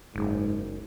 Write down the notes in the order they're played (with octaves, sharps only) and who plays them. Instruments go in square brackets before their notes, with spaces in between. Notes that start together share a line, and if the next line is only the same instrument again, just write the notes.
[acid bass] F#1 [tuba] G#2